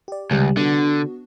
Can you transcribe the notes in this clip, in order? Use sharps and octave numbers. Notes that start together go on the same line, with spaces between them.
G4 D5
C#2 C3 D#3 G3
D3 B3 D4 F#4